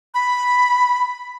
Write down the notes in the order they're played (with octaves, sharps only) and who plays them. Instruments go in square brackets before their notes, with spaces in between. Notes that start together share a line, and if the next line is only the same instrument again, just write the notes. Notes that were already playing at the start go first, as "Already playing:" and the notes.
[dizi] B5